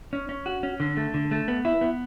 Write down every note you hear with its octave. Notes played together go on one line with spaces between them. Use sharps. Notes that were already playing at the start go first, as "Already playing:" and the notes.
C#4
C#4
F#4
C#4
D3
A3
D3
A3
B3
E4
B3